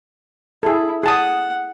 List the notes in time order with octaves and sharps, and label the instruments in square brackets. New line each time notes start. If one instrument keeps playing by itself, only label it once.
[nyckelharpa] E4 [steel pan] G#4 A4
[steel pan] G#4 A5 D#6 [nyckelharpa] F#5